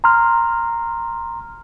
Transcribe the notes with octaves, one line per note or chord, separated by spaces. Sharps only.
A#5 C6 F6